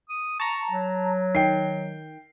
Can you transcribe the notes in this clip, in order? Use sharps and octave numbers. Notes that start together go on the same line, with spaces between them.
D#6
A5 A#5 C#6
F#3
D#3 G5 C7